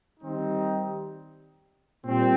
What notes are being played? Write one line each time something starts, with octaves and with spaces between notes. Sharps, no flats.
D#3 G3 C4 D#4
A#2 G3 C4